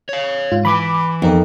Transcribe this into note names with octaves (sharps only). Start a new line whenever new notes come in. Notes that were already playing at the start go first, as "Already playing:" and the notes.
C#5 F5
G#2 F4
E3 B4 B5 D6
F2 B3 D#4 A#4